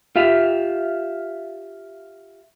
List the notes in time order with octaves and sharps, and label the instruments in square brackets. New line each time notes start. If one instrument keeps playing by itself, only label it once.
[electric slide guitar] F4 G4 E5 F5